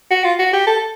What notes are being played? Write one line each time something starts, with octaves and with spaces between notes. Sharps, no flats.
F#4
F4
F#4
G4
A4